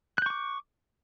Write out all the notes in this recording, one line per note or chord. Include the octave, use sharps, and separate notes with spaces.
C#6 D6 F#6 G6